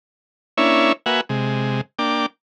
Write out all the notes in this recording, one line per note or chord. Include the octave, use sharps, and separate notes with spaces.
A#3 C#4 D4 E4 C#5 E5
A#3 F#4 B4 E5 F#5 G#5
C3 G#3
A#3 D4 G5 D6